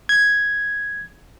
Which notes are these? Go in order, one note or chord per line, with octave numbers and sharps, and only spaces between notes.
G#6